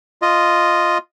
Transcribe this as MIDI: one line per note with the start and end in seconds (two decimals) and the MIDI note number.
0.22 0.98 65
0.22 0.98 75